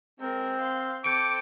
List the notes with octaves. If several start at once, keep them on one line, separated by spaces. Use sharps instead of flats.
G#3 C4 A#4
F5 C6
C4 A4 D6 G6 C#7 D7